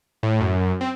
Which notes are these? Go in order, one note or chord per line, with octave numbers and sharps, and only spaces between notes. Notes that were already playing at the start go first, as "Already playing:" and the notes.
A2
F#2
C4